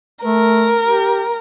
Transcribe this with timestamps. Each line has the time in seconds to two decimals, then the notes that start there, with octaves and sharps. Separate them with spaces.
0.24 A3 A#4
0.84 G4